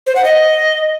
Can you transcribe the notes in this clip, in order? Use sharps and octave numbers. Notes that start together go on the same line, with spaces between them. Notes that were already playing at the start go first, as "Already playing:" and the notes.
C5
F#5
D#5